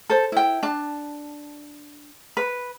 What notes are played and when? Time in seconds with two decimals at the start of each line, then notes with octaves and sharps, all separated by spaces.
0.10 A4 C5
0.32 E4 G5
0.63 D4 A5
2.37 B4